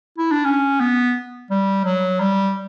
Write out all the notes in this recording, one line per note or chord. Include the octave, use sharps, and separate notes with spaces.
E4
D4
C#4
B3
G3
F#3
G3